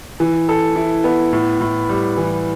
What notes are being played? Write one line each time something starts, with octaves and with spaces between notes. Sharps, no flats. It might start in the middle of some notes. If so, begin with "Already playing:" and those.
E3
A4
E4
B3
A2
A2
G3
E3